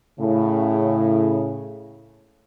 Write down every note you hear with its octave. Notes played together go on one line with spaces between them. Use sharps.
A2 C#3